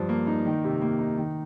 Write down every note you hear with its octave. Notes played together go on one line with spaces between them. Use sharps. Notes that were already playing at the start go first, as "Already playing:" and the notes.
Already playing: G2 F3
A#3
D#4
D#3
C3
A#3
D#4
D#3